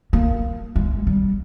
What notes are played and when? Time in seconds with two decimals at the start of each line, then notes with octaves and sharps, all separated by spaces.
0.13 A#3
0.76 G#3
1.07 G3